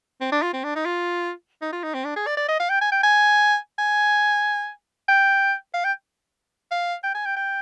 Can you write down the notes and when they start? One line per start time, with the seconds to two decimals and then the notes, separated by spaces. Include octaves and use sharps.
0.21 C4
0.32 D4
0.42 F4
0.53 C4
0.64 D4
0.76 D#4
0.85 F4
1.62 D#4
1.72 F4
1.83 D#4
1.94 C4
2.05 D4
2.16 G#4
2.27 D5
2.37 D5
2.48 D#5
2.60 F5
2.70 G5
2.81 G#5
2.92 G5
3.03 G#5
3.78 G#5
5.08 G5
5.74 F5
5.84 G5
6.71 F5
7.03 G5
7.15 G#5
7.25 G5
7.36 G5